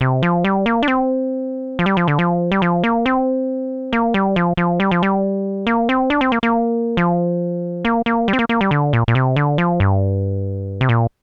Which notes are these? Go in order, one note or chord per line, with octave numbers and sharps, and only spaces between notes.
C3
F3
G3
A#3
D4
C4
F3
G3
F3
D3
F3
G3
F3
A#3
C4
A#3
G3
F3
F3
G3
F3
G3
A#3
C4
D4
C4
A#3
A#3
F3
A#3
A#3
G3
C4
A#3
A#3
G3
D3
A#2
A#2
C3
D3
F3
G2
C3
A#2